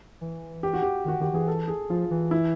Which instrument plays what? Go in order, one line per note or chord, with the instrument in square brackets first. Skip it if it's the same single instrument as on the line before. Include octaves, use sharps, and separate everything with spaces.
[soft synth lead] E3
[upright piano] G4
F#4
G4
[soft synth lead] D#3 [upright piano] F#4
[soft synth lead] D#3 [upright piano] G4
[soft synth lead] E3 [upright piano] G#4
[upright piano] A4
G#4
[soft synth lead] F3 [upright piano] F4
[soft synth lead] E3
[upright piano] E4